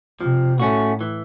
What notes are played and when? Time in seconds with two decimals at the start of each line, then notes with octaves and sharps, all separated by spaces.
0.21 C3 F3
0.60 A2 A3 C#4 F#4
1.01 E3